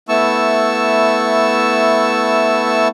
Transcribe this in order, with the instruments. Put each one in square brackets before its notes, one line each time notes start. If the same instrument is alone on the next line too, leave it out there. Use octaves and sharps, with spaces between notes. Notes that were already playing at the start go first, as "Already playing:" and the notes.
[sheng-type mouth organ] A3 B3 E4 A5 C#6 E6